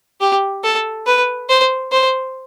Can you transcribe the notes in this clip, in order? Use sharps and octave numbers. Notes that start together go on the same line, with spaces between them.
G4
A4
B4
C5
C5